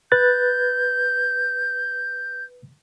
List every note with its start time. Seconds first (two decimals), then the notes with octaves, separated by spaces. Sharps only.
0.12 B4 F#6 G6 A6